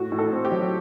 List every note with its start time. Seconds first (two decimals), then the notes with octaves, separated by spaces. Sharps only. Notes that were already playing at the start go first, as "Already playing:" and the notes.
Already playing: A2 F#4
0.12 A2
0.19 A4
0.33 C4
0.45 G4
0.51 F#3